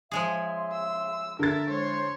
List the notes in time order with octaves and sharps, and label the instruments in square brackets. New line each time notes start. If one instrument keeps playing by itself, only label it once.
[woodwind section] C#3 E5 C6 [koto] F3 G#3 G#4
[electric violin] E6
[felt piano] D3 A6 [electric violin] A#4 E5
[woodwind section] A2 G#3 C5 [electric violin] C#5 C6